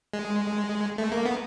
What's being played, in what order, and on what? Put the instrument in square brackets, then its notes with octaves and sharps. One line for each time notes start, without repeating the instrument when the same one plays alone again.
[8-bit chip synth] G#3
A3
A#3
B3